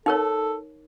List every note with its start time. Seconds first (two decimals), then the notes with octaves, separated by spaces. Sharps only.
0.06 D#4 A4 A#4 C#5